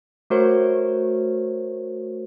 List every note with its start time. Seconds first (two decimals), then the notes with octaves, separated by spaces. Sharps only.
0.30 A3 F#4 A#4 C5 C#5